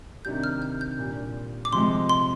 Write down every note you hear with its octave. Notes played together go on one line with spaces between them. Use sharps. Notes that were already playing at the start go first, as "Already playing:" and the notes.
C3 D#3 G3 D4 G4 G6
F6
G6
G6
A#2 G3 D4
D6
C3 F3 G#3 C6
C6